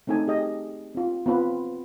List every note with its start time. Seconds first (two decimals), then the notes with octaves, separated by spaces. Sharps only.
0.07 A3 C4 D#4 A4 G#5
0.27 G4 G#4 D#5
0.95 C4 F4
1.26 B3 C4 F4 B4